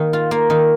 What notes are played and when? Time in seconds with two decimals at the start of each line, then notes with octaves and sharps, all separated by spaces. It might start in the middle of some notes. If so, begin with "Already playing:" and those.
Already playing: D#3 A#3
0.13 F4
0.31 A#3
0.50 D#3